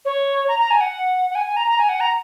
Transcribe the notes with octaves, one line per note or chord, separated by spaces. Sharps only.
C#5
A#5
A#5
G#5
F#5
F#5
G#5
G#5
A#5
A#5
G#5
F#5
A#5